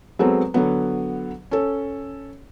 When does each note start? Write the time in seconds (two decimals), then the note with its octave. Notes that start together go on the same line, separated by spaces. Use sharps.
0.19 F#3 G#3 B3 C4 A4 B4
0.54 D3 F#3 B3
1.51 C#4 A4